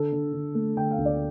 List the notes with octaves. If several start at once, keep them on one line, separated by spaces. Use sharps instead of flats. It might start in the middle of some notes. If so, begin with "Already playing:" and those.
Already playing: D3 A4
D3
D3
A3
D3 G5
F5
D2
D5